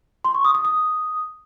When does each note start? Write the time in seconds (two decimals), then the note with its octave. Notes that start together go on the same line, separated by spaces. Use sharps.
0.25 C6
0.35 C#6
0.45 D#6
0.55 D#6
0.65 D#6